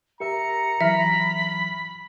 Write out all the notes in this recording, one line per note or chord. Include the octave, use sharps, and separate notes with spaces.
G4 A#4 E5 A#5 C#7
E3 F#3 E5 B5 F6